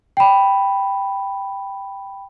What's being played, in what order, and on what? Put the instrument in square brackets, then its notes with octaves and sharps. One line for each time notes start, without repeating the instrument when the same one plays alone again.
[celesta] G5 B5